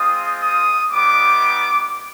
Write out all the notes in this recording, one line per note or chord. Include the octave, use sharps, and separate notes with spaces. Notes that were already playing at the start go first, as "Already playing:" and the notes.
Already playing: G#3 C4 F4 D#6
D#6
G3 B3 D#4 D6